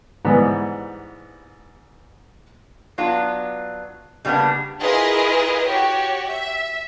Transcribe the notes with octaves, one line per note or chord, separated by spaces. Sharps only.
G#2 E3 G3 B3
F#3 B3 D4 F4
C#3 G3 A#3 B3 D4
E4 F4 G#4 A#4 B4 D#5
F#4 G4 C#5
E5